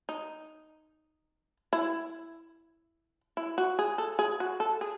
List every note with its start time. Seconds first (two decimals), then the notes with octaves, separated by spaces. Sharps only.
0.09 D#4
1.73 E4
3.37 E4
3.58 F#4
3.79 G#4
3.98 A4
4.19 G#4
4.40 F#4
4.60 A4
4.81 G#4